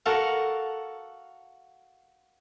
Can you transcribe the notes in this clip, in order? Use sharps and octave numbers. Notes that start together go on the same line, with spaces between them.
F#4 A4 A#4 F5 F#5